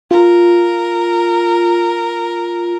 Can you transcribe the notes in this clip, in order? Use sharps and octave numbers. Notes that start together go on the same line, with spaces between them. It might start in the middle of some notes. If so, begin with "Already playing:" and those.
F4 A#4